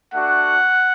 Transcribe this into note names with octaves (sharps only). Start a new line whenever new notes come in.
A3 D4 F#4 F#5